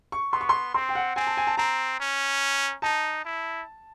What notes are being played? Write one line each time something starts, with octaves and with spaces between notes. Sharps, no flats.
C#6
B3 C6
C#6
C6
C4 C6
G5
F#5
C4 G#5
A5
G#5
A5
C4 A#5
C#4
D#4 A5
E4